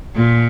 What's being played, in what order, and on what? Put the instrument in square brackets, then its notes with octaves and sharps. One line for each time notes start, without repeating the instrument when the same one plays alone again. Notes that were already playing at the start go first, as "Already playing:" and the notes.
[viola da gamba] A#2